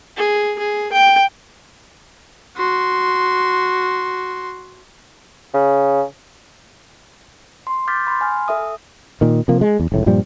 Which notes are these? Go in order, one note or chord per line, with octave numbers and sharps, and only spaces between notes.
G#4
G#4
G5
F#4 C6
C#3
C6
D6 F6 G6 A6 B6
B5 C6
G#5 F6
A4 E5 D#6
A#2 D#3
C3 F3 A#3
G#3
E2
F1 C#2 A2
G2 A#2 F3 G3